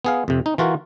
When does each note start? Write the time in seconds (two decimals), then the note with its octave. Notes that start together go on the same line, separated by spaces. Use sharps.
0.05 B3 G#4 F5
0.28 F2 C3
0.46 D#4
0.58 E3 F4 F#4 A#4